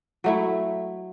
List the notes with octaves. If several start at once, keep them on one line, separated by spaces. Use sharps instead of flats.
F#3 A3 E4